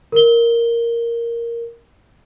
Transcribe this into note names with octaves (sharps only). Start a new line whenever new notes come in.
A#4 G7